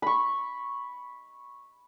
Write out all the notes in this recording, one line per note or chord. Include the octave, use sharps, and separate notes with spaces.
B5 C#6